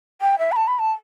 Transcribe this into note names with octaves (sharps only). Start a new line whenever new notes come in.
G5
E5
B5
A5
B5
A5